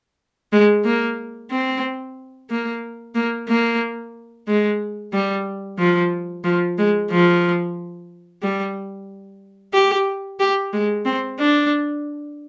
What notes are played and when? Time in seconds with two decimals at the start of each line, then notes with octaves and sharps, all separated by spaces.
0.52 G#3
0.84 A#3
1.51 C4
2.50 A#3
3.15 A#3
3.48 A#3
4.47 G#3
5.13 G3
5.78 F3
6.44 F3
6.78 G#3
7.11 F3
8.42 G3
9.73 G4
10.39 G4
10.73 G#3
11.05 C4
11.39 D4